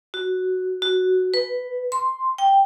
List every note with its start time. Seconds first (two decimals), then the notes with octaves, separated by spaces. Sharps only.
0.14 F#4
0.82 F#4
1.34 B4
1.92 C6
2.38 G5